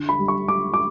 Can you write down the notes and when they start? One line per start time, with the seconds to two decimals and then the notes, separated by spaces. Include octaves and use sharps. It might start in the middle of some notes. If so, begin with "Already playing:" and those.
Already playing: D3
0.09 B5
0.19 G3
0.28 C#6
0.48 G3 D6
0.74 D6